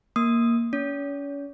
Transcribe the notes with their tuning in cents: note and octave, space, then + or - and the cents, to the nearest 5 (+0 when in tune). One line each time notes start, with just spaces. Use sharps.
A#3 +0 D#6 +5
C#4 +30 C#5 +40